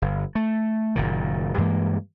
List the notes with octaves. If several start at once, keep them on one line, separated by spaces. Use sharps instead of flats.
G1
A3
F#1 A#2 D#3
G2 E3 G#3 A#3